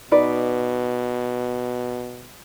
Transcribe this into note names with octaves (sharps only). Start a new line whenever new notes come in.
B2 D#4 B4 D5